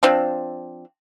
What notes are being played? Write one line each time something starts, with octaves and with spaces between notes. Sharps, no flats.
F3 C4 D4